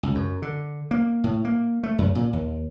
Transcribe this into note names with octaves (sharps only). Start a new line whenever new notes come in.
C#2
F#2
D3
A#3
A2
A#3
A3
F#2
A#2
D#2